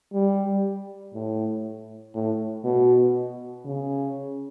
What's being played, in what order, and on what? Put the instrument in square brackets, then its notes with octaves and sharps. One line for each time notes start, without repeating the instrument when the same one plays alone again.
[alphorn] G3
A2
A2
B2
C#3